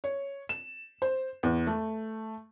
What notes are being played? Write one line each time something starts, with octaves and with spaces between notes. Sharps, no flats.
C#5
E7
C5
E2
A3